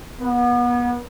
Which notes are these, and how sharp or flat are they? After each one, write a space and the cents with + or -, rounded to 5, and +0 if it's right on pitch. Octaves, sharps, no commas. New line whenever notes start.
B3 -30